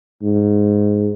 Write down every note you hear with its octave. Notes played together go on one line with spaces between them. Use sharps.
G#2